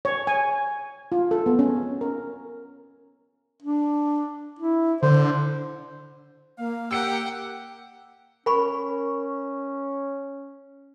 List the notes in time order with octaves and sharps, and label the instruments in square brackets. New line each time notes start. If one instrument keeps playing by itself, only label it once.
[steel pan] C#5
G#5
F4
A4
B3
C#4
A#4
[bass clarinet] D4
E4
[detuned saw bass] D3 [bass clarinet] C5
[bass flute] A#3 [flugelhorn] F5
[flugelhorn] G4 [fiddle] F#5 G5 [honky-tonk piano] E6 C#7
[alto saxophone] C#4 [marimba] A#4 [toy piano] G#5 B5 C#6